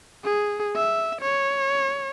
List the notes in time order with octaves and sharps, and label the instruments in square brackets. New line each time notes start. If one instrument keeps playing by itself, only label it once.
[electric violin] G#4
E5
C#5